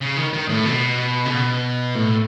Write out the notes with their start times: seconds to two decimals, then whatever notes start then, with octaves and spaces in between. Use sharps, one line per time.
0.01 C#3
0.17 D#3
0.33 D#3
0.49 A2
0.66 B2
1.26 C#3
1.30 B2
1.95 A2